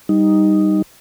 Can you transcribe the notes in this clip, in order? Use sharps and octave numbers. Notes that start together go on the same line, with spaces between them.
G3 D#4